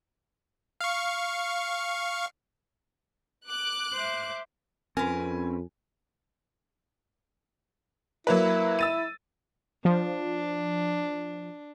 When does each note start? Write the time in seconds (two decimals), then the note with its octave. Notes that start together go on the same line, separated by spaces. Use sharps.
0.81 F5 C#6
3.49 D6 F#6
3.94 C5 E5
4.97 F2 C4 C#4 A#4 B4 G#5
8.27 F#3 A#3 E4 B4
8.79 E6 A6 D#7
9.85 F3 D4